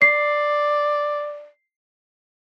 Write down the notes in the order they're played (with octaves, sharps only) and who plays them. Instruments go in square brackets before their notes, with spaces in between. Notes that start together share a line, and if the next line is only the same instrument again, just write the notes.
[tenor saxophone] D5 [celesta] C7